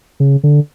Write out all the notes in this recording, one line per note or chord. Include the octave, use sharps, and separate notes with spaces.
C#3
D3